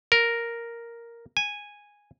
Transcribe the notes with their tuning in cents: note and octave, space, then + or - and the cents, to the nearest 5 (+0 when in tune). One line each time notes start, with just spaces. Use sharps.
A#4 +0
G#5 -10